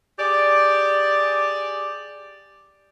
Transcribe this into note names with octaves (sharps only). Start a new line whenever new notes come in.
G4 G#4 D5